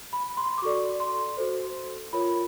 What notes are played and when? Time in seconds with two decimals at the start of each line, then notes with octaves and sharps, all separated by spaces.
0.13 B5
0.37 C6
0.58 D6
0.62 F#4 A4 D5 C#6
1.00 C6
1.37 F#4 A4 C5
2.13 F4 A#4 C#5 B5